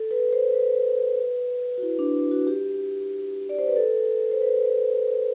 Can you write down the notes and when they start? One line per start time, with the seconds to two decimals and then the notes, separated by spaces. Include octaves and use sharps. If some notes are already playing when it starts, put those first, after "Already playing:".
Already playing: A4
0.11 B4
0.33 C5
0.53 B4
1.78 F#4
1.83 E4
1.99 D4
2.31 F#4
2.47 G4
3.49 D5
3.59 C5
3.68 B4
3.76 A4
4.32 C5
4.41 B4